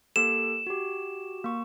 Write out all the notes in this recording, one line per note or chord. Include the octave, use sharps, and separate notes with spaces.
A#3 G4 A4 E7
F#4 G4
A#3 C#6